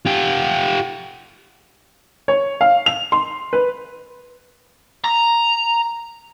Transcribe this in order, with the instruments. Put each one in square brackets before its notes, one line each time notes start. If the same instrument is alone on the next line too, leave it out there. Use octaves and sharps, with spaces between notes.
[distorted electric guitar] F4 G4
[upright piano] C#5
F5
F7
C6
B4
[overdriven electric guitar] A#5